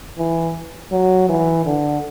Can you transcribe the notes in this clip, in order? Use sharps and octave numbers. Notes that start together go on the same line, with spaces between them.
E3
F#3
E3
D3